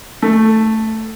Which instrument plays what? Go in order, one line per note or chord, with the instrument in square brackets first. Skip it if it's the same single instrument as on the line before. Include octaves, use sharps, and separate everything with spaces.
[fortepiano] A3